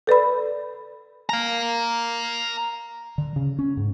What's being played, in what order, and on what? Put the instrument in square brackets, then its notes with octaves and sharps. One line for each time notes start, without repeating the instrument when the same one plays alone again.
[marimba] A4 B4 D5 B5
[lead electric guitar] F5 A#5
[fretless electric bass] D3
C#3
C#4
G#2